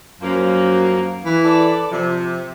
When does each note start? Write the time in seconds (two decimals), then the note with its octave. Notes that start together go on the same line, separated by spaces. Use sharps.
0.21 F#2 F3 A#3
1.25 E3
1.44 A4 D5
1.91 C3 F3